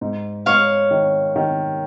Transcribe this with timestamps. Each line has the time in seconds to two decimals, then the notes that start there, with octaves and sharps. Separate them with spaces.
0.01 G#2
0.46 G#2 C#5 F5
0.91 D#3
1.36 D#3